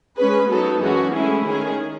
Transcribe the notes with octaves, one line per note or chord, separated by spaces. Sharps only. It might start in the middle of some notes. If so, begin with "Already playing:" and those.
G#3 C#4 G#4 B4
F#3 B3 D#4 F#4 A4
F#2 E3 G#3 C#4 F#4
A2 G#3 C#4 E4 G#4
D#3 G#3 C#4 G#4